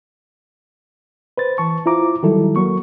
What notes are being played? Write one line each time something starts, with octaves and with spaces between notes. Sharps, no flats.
B4 C5 A6
E3 A5 C#6
E4 F4 C5 A#5 D6
D#3 F#3 G3 E4 A4
F#3 A#3 C#6